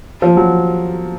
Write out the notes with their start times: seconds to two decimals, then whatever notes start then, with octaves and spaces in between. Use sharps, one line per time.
0.22 F3
0.37 F#3